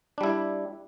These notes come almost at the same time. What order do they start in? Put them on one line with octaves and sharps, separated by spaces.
D4 G3 E4